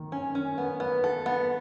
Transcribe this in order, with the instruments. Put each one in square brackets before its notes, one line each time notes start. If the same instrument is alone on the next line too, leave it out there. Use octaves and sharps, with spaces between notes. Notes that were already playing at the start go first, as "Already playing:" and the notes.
Already playing: [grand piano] D#3
[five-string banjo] C#4
C#4
B3
B3
A4
B3